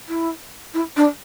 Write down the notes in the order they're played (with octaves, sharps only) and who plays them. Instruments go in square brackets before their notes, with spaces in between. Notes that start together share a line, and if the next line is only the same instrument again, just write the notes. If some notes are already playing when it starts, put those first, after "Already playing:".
[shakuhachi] E4
E4
D4